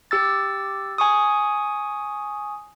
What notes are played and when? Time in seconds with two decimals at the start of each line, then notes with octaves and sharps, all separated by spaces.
0.11 G4 E6 A6
0.98 G#5 C#6 D#6